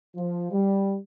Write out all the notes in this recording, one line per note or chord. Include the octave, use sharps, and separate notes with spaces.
F3
G3